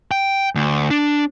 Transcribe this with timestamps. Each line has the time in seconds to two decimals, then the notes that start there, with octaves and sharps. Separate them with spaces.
0.11 G5
0.55 D2
0.90 D4